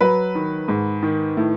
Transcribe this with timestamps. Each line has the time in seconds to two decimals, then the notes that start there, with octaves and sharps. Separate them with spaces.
0.01 F#3 B4
0.35 D#3
0.68 G#2
1.02 D#3
1.37 A2